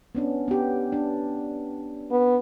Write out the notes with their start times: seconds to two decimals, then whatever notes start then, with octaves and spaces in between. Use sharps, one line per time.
0.15 B3 C#4 D4
0.48 B3 G4
0.92 D4
2.11 B3